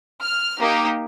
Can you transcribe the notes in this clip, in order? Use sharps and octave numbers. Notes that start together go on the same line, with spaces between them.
F6
A#3 D#4 G4